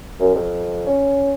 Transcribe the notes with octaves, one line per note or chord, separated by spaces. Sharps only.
F#2
F2
C#4